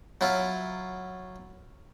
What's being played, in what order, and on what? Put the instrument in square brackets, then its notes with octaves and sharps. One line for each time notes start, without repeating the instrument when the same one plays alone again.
[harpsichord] F#3 E4 F4